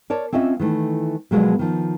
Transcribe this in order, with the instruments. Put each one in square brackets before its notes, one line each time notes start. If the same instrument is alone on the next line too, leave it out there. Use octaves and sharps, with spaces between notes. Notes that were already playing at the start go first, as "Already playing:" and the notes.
[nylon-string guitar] A#4 C#5 D5 A5
C4 C#4 F4 D#5 E5
D#3 E3 A3
B2 F3 F#3 G#3 A#3 B3
D#3 F3